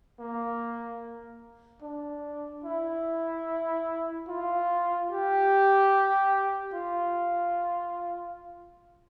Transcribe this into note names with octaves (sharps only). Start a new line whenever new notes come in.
A#3
D4
E4
F4
G4
F4